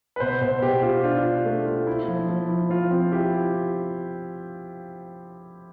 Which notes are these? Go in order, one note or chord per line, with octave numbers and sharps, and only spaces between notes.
B4
B2 C5
B2 C5
B2 G4
F4 G4
D4 F4
F4
A3
F4
E4
F3
F3
E4
F3 F4
C4 F4
E4 G4